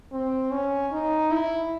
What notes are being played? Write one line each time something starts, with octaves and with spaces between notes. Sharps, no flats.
C4
C#4
D#4
E4